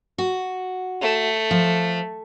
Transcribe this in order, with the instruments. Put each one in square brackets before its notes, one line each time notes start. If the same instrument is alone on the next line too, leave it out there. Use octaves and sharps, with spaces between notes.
[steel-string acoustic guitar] F#4
[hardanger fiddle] A3
[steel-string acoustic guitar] F3